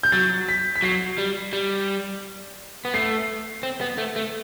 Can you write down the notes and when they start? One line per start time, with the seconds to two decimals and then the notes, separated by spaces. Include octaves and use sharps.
0.03 G6
0.12 F#3 A6
0.49 B6
0.76 B6
0.82 F#3 C7
1.18 G3
1.53 G3
2.85 B3
2.94 A3 C7
3.63 C4
3.81 B3
3.98 A3
4.16 A3